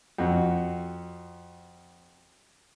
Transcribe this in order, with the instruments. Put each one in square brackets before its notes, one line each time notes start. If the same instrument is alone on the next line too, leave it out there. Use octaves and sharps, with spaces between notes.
[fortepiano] F2 F#4